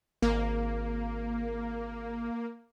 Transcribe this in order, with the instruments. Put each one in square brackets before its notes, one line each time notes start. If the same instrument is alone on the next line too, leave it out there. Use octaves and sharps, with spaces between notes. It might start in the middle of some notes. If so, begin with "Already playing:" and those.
[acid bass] G#1 [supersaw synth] A#3